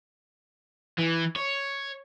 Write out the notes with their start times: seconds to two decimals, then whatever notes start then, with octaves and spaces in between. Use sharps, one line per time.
0.99 E3
1.36 C#5